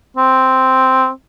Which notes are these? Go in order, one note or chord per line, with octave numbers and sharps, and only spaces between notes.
C4